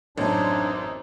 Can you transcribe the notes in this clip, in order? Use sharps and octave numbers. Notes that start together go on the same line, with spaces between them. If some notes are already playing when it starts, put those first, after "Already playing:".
A1 F#2 C4 D4 D#4 C#5